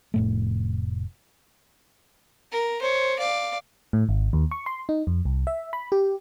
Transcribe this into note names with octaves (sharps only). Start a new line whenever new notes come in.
F1 A2 A3
A#4
C5 C#5
D5 F5
A2
G#1
D#2
C#6
C6
D#4
F2
C2
E5
B5
G4